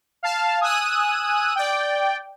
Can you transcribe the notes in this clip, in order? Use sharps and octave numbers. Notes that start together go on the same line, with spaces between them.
F5 A5
G#5 D#6 E6 F#6 D#7
D5 G5